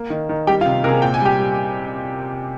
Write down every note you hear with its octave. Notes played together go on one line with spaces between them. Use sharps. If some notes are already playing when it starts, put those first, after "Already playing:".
Already playing: A#3
D#3
D#3
G3 G4 G5
F4 F5
C3
C3 G#4 A#4
A#2 G5
G#5
G3 G4 G5
G3